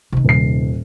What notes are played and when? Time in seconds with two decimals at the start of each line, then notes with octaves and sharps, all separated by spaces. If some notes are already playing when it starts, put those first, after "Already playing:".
0.12 C3 D#3
0.24 D#1 C7